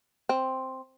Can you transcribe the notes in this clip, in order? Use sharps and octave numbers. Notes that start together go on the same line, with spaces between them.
C4